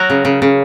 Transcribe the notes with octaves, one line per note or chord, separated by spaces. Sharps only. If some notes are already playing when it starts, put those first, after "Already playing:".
Already playing: F#3 F#4 A#4
C#3
C#3
C#3